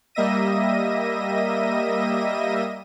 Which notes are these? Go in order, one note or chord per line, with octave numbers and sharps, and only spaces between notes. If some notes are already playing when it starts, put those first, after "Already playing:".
G3 A#3 D#5 E5 A#6 D#7